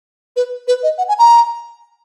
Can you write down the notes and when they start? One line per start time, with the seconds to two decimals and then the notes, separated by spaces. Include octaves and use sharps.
0.36 B4
0.68 B4
0.83 D#5
0.98 F#5
1.08 G#5
1.19 A#5